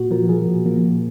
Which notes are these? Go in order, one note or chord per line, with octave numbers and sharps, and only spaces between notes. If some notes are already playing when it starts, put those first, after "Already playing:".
Already playing: A#2 F#4
F3 A#4
F3 G#4
A#2
F3 A#3
A#2